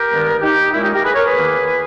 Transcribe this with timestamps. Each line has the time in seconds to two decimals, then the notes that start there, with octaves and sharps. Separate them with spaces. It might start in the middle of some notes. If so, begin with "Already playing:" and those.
Already playing: G4 A#4
0.10 G2 D#3 G#3 B3
0.41 D#4 G4
0.72 A#2 G#3 C#4 E4
0.82 D#4 G4
0.93 G4 A#4
1.04 G#4 B4
1.14 A#4 C#5
1.25 G#4 B4
1.35 E2 D#3 A#3